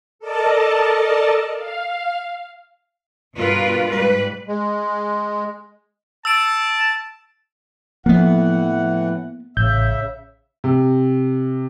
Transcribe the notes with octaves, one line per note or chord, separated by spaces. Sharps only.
A4 A#4 D5 D#5 A5
F5
G2 B2 B3 F4 A#4 B4
G#2 G3 B4
G#3
A5 E6 D7
A2 E3 F3 A#3 B3 F#5
A1 C#3 E5 G6
C3